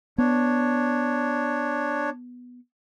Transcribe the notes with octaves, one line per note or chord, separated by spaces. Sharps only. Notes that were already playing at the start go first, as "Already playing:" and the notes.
B3 D4 C#5